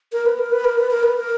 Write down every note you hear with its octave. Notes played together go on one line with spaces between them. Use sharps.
A#4
B4
A#4
B4
A#4
B4
A#4
B4
A#4